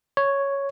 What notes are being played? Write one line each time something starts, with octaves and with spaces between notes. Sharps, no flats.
C#5